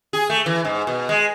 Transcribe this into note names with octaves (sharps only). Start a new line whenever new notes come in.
G#4
A3
E3
G#2
B2
G#3